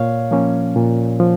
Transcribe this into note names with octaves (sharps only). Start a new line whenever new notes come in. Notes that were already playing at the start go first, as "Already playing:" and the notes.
Already playing: A#2 C#5 F5
F3 A#3 C#4
A#2
F3